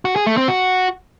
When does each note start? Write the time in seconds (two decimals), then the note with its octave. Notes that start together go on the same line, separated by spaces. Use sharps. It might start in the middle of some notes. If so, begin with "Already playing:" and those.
0.05 F#4
0.16 G#4
0.27 A3
0.37 C4
0.48 F#4